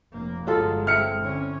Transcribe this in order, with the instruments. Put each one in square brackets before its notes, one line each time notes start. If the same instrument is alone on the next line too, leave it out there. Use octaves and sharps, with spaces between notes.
[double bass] F1 A#3
[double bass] G1 G#3 [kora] F#3 F4 A4
[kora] C4 E4 [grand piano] F6 C#7
[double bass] D3 C#4